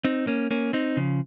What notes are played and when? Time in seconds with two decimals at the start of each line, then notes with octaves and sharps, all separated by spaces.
0.04 C4 D#4
0.27 A#3 C#4
0.51 A#3 C#4
0.73 C4 D#4
0.97 C#3 F3